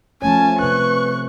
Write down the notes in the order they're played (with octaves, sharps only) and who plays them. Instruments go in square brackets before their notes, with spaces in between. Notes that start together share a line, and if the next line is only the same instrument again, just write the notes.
[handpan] F3 A3 C#5 [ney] C#4 [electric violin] G#5 A5
[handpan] C3 C#4 [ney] B4 [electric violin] C#6 F#6